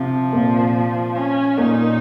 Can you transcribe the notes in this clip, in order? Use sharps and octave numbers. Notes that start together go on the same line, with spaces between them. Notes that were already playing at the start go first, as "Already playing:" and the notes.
Already playing: C3 F3
A#2
C#4
A#2 D#4